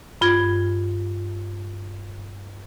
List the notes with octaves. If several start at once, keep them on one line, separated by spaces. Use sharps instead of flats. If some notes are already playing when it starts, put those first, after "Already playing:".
G2 F4 G#6